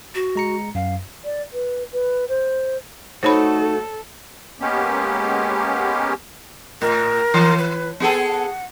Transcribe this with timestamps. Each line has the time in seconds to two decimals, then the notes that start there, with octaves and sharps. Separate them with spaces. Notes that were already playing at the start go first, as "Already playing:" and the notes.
0.15 F#4
0.36 G#3 A#5 C#7
0.75 F#2 F5
1.25 D5
1.53 B4
1.92 B4
2.29 C5
3.23 A3 D#4 F#4 A4 C5 C#5 B5
4.61 G#3 A#3 B3 C#4 G4
6.82 A2 A#4
7.34 E3
7.58 B4
8.00 B3 G#4 A4 A5
8.28 F#5